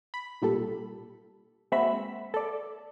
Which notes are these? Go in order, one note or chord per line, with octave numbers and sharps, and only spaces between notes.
B5
B1 A#2 G3 A4
G#3 A#3 C4 F#4 E5 B5
A4 D5